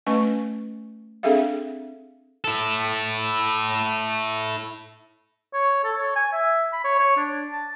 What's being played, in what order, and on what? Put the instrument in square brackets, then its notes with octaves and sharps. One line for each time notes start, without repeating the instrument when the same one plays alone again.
[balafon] A3 C#4 B4 D#5 G#5 C#6
C4 D4 G#4 A4 E5 F5
[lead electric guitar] E4 A4
[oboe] C#5
A4
C#5
G#5
E5
B5
C#5
C#5
D4
A5